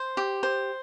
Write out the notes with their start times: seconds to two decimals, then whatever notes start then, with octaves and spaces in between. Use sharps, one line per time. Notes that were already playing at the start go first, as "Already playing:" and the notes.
Already playing: C5
0.17 G4
0.43 C5